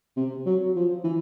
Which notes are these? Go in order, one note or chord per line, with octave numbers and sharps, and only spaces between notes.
C3
F#3
F3
E3